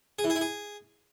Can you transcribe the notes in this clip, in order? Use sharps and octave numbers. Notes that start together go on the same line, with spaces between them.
G#4
E3
G#4
E4
G#4